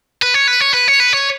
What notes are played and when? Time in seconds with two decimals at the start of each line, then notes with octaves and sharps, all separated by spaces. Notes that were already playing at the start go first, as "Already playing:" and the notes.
0.22 B4
0.34 C#5
0.48 B4
0.60 C#5
0.74 B4
0.88 C#5
1.00 B4
1.13 C#5